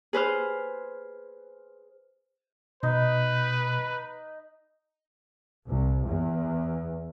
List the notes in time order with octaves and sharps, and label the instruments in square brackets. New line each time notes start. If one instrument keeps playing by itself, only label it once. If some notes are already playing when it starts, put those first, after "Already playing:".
[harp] G#4 B4 C5 F6
[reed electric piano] B2 [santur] D#4 [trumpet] B4
[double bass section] C2
E2